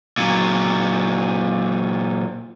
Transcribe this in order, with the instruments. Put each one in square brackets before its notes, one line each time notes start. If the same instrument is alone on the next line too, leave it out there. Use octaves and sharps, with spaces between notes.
[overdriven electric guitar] A#2 F#3